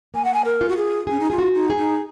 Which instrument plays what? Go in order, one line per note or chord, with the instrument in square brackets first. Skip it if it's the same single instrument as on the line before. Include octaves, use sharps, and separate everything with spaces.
[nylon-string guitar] A#3 [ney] G#5
[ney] F#5
G#5
A#4
[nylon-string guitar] F4
[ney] F#4
G#4
[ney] C#4 [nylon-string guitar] G#4
[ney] D#4
[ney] F4 [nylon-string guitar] G#4
[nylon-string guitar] F#4
[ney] D#4
[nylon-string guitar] G#4
[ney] D#4